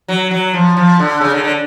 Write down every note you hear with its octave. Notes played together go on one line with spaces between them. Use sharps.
F#3
F#3
F3
F3
D3
C#3
D3
D3